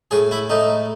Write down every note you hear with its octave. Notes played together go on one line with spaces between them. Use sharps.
A2 G#4
E4
A2 D#4